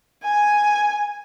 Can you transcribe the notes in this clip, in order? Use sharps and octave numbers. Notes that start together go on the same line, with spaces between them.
G#5